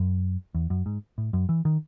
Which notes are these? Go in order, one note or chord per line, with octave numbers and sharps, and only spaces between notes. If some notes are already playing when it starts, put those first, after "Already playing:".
Already playing: F#2
E2
F#2
G#2
A2
F#2
E3
D#3